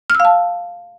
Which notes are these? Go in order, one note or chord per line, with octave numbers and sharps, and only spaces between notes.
F6
E6
F5
A5